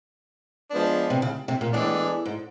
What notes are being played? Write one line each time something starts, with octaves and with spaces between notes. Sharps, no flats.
F3 G#3 B3 D4
C3
C#3
C3
A#2
A2 E3 G#3 B3 D4
G#2